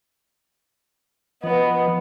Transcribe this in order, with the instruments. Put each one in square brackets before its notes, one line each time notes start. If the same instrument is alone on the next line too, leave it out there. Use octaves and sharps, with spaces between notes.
[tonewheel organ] F3 [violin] B3 [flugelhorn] D#5